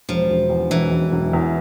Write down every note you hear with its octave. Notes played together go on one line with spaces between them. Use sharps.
E1 F3
E1
E2
E1 E3
E1
E1
E2